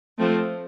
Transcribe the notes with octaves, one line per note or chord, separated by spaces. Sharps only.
F3 A3 C4